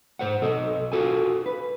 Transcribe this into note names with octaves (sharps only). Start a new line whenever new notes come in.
G#2 C5 F#5
B1 A4 D#5
F4 F#4 A4 G#5
B4